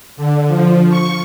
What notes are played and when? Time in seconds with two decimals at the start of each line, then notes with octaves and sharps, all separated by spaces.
0.17 D3
0.48 F3
0.90 C#6